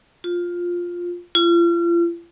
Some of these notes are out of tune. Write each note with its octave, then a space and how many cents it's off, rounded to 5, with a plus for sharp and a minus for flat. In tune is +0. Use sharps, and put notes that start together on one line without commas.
F4 +5
F4 -40